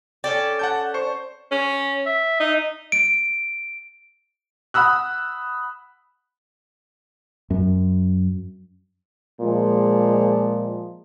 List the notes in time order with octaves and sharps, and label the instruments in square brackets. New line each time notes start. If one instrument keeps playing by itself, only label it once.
[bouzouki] C#4 A4 D5 [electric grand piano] G5
[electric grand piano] F#5 A5 G6
C5 C#6
[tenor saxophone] C#4
E5
D#4
[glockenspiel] D7
[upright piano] F#5 B5 D#6 E6 F#6
[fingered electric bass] F#2
[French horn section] A#2 F3 G#3